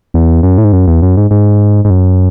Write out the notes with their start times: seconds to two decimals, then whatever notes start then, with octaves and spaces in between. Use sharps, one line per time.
0.14 E2
0.43 F#2
0.58 A2
0.64 G#2
0.73 F#2
0.87 E2
1.02 F#2
1.17 G#2
1.31 G#2
1.85 G#2
1.90 F#2